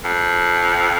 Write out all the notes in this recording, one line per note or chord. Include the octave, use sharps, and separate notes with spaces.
F2